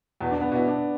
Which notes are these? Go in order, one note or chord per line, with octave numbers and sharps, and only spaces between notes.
E2 B2 B3
D4
B3
B2 B3 E4
D4